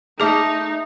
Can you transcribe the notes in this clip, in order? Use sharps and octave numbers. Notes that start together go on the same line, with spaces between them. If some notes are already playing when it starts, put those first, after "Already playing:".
A3 D#4 G#4 E5 A5 D6